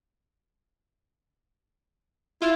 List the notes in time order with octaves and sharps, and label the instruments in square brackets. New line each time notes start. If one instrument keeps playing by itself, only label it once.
[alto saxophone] E4 [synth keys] F4